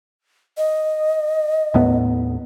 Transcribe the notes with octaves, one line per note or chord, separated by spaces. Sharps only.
D#5
D#2 A2 B3